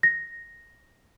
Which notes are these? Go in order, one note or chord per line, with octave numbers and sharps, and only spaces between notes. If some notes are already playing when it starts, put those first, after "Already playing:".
A#6